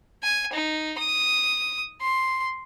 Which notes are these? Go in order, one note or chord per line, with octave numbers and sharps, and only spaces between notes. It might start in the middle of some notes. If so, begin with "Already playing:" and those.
G#5
D#4
D#6
C6